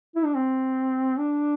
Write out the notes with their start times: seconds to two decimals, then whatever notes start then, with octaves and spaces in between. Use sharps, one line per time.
0.16 E4
0.25 D4
0.35 C4
1.18 D4